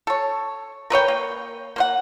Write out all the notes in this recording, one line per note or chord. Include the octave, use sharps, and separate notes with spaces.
A4 C#5
A#4 B4 C#5 G5
A#3
A#3 C5 F#5